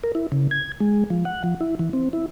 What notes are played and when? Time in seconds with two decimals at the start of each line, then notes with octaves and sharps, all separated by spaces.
0.04 A#4
0.15 E4
0.32 C#3
0.51 G#6
0.80 G#3
1.10 F3
1.25 F#5
1.44 F3
1.60 E4
1.79 E3
1.93 C4
2.13 E4